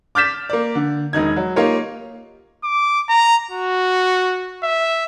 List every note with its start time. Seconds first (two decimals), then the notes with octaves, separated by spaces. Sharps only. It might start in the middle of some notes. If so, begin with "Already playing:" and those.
0.15 D6 F6 G6 A6 B6 E7
0.49 A#3 D5
0.75 D3
1.13 E1 D#3 D#4 G#6
1.36 F#3
1.56 A#3 D#4 F4 G4 C#5
2.64 D6
3.09 A#5
3.51 F#4
4.63 E5